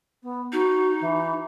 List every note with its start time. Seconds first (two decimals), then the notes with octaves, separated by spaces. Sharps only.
0.23 B3
0.52 D#4 F#4
1.01 E3